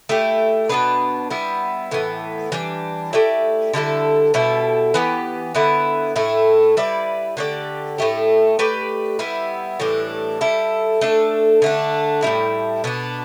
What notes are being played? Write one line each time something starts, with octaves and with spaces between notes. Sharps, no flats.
A3 E4 G4
B2 B3 D4 B4
G3 B3 E4
A2 E3 B3
E3 G3 D4
A3 E4 G4 D5
D3 G3 E4 A4
B2 G3 E4 A4
E3 B3 G4
D3 B3 E4 B4
A2 A3 E4
G3 E4 B4 D5
D3 A3 G4 D5
A2 A3 G4
A3 G4 B4 D5
G3 B3 E4
A2 E3 G3 D4
G3 E4 A4
A3 D4 A4
D3 A3 D4
A2 G3 E4
B2 B3 D4